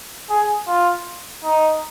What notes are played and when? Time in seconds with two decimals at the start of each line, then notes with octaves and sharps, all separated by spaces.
0.30 G#4
0.68 F4
1.44 D#4